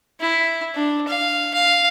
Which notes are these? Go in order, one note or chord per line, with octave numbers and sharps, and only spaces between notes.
E4
D4
F5
F5